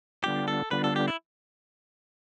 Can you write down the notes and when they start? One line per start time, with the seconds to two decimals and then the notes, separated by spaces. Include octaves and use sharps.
0.24 D3 G3 B3 D4 F4 G4
0.48 A4
0.71 D3 G3 B3 D4 F4 B4
0.84 A4
0.96 G4
1.08 E4